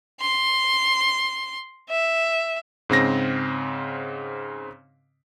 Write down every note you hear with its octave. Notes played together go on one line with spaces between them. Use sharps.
C6
E5
G#2 C#3 C4 A#6